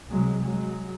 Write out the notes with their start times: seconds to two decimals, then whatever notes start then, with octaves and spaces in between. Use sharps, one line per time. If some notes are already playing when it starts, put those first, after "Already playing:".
0.11 C2 C3 F#3 G#3
0.43 F#3 G#3